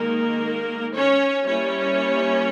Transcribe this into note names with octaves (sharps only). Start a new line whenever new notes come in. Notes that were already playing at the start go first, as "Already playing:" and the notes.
Already playing: D#3 G#3 A#3 D#4 A#4
C#4 C#5
G3 A#3 C#4 E4 C#5